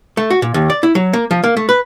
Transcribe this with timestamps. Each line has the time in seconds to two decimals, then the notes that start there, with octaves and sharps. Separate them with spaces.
0.17 A3
0.30 F#4
0.42 A#2
0.54 D#2
0.70 D5
0.83 E4
0.95 F#3
1.13 A#3
1.31 F3
1.44 A#3
1.57 A3
1.69 B4